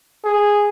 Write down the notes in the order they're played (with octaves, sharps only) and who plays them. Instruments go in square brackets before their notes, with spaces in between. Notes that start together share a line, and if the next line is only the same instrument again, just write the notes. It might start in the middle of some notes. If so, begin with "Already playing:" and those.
[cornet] G#4